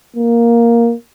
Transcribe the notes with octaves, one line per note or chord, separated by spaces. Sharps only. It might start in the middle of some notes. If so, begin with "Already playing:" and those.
A#3